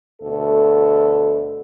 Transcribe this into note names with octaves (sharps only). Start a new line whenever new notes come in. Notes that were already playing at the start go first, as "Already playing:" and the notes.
D2 B2 A4